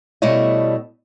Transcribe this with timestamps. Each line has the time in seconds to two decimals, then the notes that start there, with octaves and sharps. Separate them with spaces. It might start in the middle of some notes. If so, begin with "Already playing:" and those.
0.22 B2 G3 A3 E4 C#5 D#5